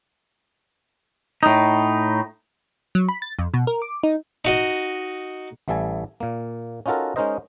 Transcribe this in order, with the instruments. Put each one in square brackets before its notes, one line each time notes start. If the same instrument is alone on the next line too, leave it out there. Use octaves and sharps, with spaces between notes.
[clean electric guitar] A2 D#4
[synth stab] F#3
B5
A6
F2
B2
A#4
D6
D#4
[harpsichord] D#4 F#4 D#5
[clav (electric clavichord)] A1 E3 G3 A4 G#5
A#2 A#3
C#4 D#4 F4 F#4 A4 A#4
G#3 C#4 D#4 A#4 C5 D#5